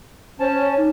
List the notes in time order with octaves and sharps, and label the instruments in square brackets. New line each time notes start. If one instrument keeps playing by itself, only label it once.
[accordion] C#4 A5 [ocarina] C5
[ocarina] C#5
D#4